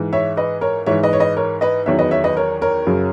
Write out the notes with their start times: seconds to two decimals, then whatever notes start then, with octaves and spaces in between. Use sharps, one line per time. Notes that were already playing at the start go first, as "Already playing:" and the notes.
Already playing: G#2 E3
0.13 C#5 E5
0.37 B4 D#5
0.61 A#4 C#5
0.86 G#2 E3 C#5 E5
1.03 B4 D#5
1.13 C#5
1.20 B4 D#5
1.37 A#4 C#5
1.61 B4 D#5
1.86 E2 D#3 F#3 C#5 E5
1.99 B4 D#5
2.11 C#5 E5
2.24 B4 D#5
2.37 A#4 C#5
2.61 A#4 C#5
2.86 F#2 C#3 F#3